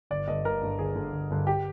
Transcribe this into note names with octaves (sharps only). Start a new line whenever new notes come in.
G1 D5
G2 D3 D#5
G1 A#4
G2 D3
G1 G#4
G2 D3
G1
G2 D3
G4